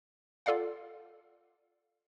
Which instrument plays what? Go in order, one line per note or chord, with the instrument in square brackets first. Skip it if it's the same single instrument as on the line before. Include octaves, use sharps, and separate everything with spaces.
[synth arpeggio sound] F4 A4 D5 F5 F#5